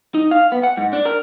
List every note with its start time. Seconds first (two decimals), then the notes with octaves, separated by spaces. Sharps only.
0.15 D#4
0.31 F5
0.52 B3
0.63 F#5
0.77 G#2
0.93 D4
1.05 A#4